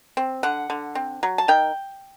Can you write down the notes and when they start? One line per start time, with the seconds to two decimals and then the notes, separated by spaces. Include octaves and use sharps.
0.17 C4
0.43 D3 F#5
0.70 D3
0.95 C4
1.23 F#3
1.38 A5
1.48 D#3 G5